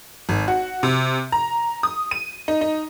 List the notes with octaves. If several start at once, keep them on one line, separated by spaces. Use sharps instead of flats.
G#1
F#4
C3
A#5
D#6
D#7
D#4
D#4